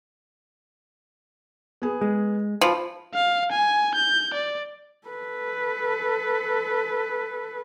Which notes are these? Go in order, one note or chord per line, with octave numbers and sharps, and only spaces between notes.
B3 G#4
G#3
F3 F4 B5
F5
G#5
G6
D5
A4 B4